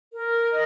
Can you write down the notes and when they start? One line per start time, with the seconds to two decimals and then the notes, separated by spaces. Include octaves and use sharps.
0.12 A#4
0.50 D#5